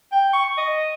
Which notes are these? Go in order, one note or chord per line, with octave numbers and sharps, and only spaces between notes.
G5
C#6
D#5